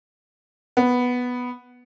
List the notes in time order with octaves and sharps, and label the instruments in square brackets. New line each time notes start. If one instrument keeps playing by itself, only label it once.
[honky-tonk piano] B3